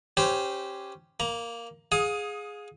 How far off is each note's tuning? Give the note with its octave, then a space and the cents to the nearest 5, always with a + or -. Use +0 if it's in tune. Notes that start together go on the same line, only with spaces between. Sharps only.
C#4 +0 G4 +0 C5 -20
A#3 +0 A#5 +30
G#4 +0 F5 +40 D#6 +15